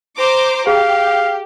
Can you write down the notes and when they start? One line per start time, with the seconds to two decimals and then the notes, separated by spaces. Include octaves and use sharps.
0.17 C5 A#5 D6
0.67 G4 G#4 F5